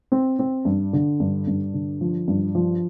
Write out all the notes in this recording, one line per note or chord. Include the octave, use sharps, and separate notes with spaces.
C4
C4
G2
D3
G2
G2
D3
F3
G2
F3